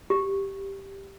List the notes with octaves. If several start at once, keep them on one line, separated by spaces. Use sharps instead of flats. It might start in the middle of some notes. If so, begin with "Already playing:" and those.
G4